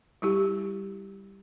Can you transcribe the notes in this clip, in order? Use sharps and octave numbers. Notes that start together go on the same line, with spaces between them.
G3 E4 G4